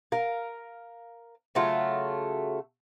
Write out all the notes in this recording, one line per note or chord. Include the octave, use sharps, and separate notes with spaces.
A#4 F5
C#3 F#3 A3 F4